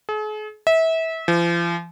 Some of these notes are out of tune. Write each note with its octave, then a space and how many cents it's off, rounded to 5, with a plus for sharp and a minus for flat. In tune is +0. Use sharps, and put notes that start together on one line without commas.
G#4 +45
E5 -25
F3 -40